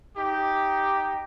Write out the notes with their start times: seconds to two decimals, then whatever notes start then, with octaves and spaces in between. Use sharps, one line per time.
0.16 D#4 G4